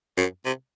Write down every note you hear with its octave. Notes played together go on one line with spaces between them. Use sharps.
F#2
C3